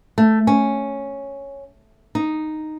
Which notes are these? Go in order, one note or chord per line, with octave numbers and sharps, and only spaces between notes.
A3
C#4
D#4